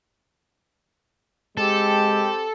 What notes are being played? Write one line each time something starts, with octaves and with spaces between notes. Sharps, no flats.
G#3 C4 G4 A4